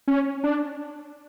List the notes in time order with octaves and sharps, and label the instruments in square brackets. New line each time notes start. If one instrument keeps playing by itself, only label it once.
[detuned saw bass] C#4
D4